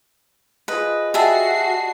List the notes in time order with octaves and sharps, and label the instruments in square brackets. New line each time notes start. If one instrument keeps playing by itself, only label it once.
[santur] F3 G#4 D#5 [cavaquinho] B4
[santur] G3 A5 B5 [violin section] F#4 C7 [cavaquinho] G#4 E5